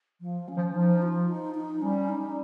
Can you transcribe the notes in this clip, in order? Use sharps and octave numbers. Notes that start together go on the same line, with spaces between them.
F3
C#4
F3
F3 D#4
F4
D#4
D#4
G3 C#4
D#4